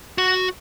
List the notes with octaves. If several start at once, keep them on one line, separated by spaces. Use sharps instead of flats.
F#4